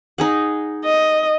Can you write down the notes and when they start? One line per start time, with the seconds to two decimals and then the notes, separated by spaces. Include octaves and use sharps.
0.18 D#4 G#4 F#5
0.85 D#5